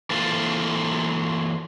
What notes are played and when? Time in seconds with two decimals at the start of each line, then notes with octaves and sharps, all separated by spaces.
0.10 E3 A#3 C4 F4 A4 C5